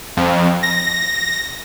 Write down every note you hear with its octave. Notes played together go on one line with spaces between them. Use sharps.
F2
A#6